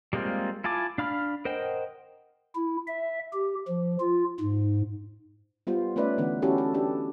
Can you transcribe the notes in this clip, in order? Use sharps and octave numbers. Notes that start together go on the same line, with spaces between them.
G3 G#3 A#3 C4 F4
E4 F4 G#5 A5 D6
D4 F5 B5 F6
A#4 C5 D#5 F#5 G5
E4
E5
G4
F3
F4
G#2
G3 B3 F4 C5
A3 C#4 D#4 B4 D5 E5
D3 E3 B3
C#4 E4 F#4 G4 A4
A4
D4 G4 A4